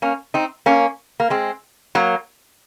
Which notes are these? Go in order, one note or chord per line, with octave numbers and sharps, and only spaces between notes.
A#3 C#4
C4 D#4
A#3 C#4
A#3
G#3 C4
F#3 A#3